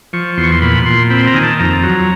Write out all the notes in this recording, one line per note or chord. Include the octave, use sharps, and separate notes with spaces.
F3 C#6
E2 C6
C#6
C6
A#2 B5
A#2 C6
C4 B5
A#5
D#3 G#5
A5
F2 A#5
F#3